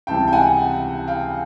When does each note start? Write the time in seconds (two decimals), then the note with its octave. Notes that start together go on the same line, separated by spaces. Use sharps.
0.07 C#2 C3 E3 G3 G5 A5
0.28 G5
0.32 F#5 G#5
1.08 F5 G5